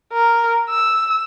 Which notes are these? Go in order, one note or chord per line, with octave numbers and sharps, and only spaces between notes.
A#4
E6